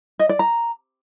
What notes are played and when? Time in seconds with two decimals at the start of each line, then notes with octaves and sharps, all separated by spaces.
0.19 D#5
0.29 D5
0.39 A#5